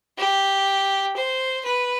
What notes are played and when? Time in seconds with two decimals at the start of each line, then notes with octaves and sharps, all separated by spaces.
0.18 G4
1.16 C5
1.64 B4